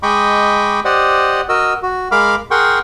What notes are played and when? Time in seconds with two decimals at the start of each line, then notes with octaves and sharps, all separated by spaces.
0.03 G#3 D#5 G5 B5 C#6 D6
0.85 G4 C5 D5 D#5 F#5
1.49 F#4 A#4 D#5 E6
1.83 F#4
2.12 G#3 A#4 F5 B5 D6 F6
2.51 G#4 A#4 F#5 G5 C6 C#6